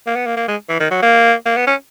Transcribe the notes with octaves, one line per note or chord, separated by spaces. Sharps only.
A#3
B3
A#3
A#3
G#3
E3
D#3
F#3
A#3
A#3
B3
C#4